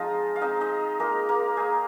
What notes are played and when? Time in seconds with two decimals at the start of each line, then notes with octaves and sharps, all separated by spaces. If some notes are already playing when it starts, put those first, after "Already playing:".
Already playing: F3 G#3 C4 D#4 F4 D#5
0.36 F5
0.41 G#3 C4 D#4 F4 D#5
0.61 D#4 D#5
1.00 G#3 A#3 F4 A#4
1.29 A#3 A#4
1.57 A#3 D#4 G#4